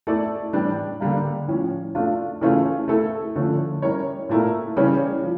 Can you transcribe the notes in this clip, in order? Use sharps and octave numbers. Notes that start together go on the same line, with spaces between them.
A3 E4 A4 D5
A2 E3 G3 D4
D3 G3 A#3
A2 F3 C#4
A3 D4 F4
C#3 E3 A3 C#4 F4
A3 E4 A4
D3 F3 A3 C#4
G3 C#4 E4 A#4 C#5
A#2 A3 E4 A#4
C#3 E3 G3 C#4
F3